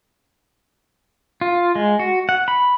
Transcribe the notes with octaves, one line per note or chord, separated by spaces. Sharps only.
F4
G#3
F#4
F#5
B5